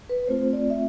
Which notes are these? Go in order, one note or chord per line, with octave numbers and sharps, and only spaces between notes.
B4
A3 C4 F4 C5
D5
E5